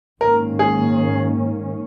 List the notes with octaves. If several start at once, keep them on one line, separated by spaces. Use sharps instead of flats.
G#2 D#3 A#3 C#4 A#4
G#4